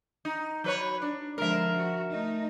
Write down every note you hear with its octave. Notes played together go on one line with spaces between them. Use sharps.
D#4
F#3 B4 C#5
D4
D3 F3 G#3 A#4 E5
F#4
A3 D#4